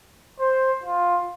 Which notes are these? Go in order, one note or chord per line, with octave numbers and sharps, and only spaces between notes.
C5
F4